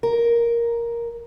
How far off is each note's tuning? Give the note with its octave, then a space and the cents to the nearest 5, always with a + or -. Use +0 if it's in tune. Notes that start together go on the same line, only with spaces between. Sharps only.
A#4 +5